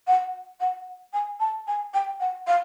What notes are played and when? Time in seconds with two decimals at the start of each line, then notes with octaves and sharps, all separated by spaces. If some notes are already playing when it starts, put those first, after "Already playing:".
0.07 F#5
0.60 F#5
1.13 G#5
1.39 A5
1.67 G#5
1.93 G5
2.20 F#5
2.47 F5